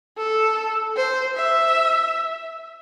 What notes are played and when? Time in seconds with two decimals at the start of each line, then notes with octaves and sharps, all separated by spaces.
0.18 A4
0.97 C5
1.36 E5